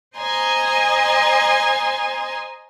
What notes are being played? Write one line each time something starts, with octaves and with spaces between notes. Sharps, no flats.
C5 D#5 G#5 A#5 C6